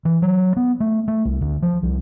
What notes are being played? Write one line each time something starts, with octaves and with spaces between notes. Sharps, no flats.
E3
F#3
B3
A3
A3
C2
D2
F3
C2